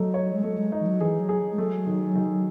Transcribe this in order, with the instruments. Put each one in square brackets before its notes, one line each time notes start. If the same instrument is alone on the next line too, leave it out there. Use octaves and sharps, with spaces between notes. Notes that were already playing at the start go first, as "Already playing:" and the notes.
Already playing: [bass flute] F#3 [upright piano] A3 D#4
[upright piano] C#5
[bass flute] G#3
[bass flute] F#3 [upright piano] A3
[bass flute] G#3
[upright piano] D#4
[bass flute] E3
F#3
[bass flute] E3 [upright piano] G#4
[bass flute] F#3
[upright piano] G#4
[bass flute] G#3
[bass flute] F#3 [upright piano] A3
[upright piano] D#3
D#3